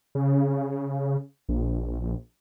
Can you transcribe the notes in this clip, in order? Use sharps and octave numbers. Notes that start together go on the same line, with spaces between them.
C#3
A#1